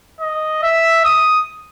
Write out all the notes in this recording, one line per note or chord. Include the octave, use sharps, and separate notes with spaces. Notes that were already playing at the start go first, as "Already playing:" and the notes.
D#5
E5
D#6